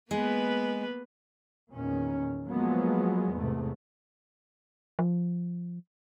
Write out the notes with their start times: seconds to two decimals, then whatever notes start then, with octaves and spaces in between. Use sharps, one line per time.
0.11 G#3 A#3 B3 B4
1.72 E2 A#2 D#3 C#4
2.48 F3 F#3 G#3 A#3 B3
3.33 E2 G#2 C3 A3
4.99 F3